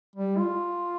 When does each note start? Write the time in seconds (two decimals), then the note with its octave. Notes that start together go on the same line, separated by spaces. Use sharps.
0.16 G3
0.38 F4